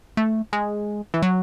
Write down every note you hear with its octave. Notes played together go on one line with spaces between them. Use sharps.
A3
G#3
E3
F#3